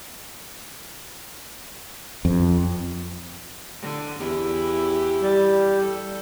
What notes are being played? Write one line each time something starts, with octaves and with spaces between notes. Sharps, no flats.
F2
D3
E2 E4 G4
G3
A4